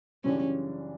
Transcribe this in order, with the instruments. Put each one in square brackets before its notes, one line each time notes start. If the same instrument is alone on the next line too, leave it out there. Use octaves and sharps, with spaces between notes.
[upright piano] F#2 C#3 E3 G3 D4 [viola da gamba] C#4